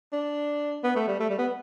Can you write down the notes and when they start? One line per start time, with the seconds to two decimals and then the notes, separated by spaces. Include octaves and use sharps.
0.13 D4
0.84 B3
0.96 A3
1.08 G3
1.20 A3
1.30 G3
1.38 B3